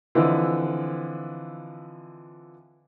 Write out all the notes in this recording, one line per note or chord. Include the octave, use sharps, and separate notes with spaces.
D3 E3 F3 C4 E4 D#5